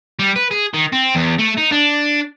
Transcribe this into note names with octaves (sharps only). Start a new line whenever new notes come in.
G3
B4
G#4
D#3
C4
E2
A3
D#4
D4